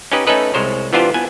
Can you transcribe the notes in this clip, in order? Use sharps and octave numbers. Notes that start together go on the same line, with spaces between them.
C#4 D#4 G4 B4 D#5
A3 C#4 D#4 A4 B4 D#5
C2 G#3 C5 C#5
E3 B3 D4 F4 G4 C5
B3 G#5